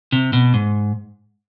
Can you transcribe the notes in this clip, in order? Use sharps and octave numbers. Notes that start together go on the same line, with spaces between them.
C3
B2
G#2